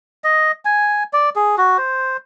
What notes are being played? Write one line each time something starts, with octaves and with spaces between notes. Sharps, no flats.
D#5
G#5
D5
G#4
F#4
C5